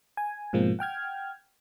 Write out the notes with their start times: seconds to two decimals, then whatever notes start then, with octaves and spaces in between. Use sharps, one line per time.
0.17 G#5
0.53 G#2 B2 F3 G#3 A#3 C4
0.79 F#5 G5 F6 G#6